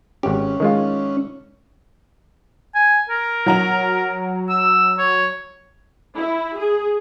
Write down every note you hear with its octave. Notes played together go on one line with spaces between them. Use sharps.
G#1 C#4 G4
D#3 G#3 F4
G#5
A#4
F#3 A#5 F7
E6
C#5
E4
G#4